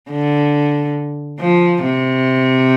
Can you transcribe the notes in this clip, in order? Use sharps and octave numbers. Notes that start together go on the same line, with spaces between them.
D3
F3
C3